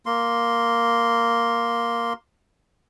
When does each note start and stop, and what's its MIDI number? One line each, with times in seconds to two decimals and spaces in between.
0.06 2.13 58
0.06 2.13 84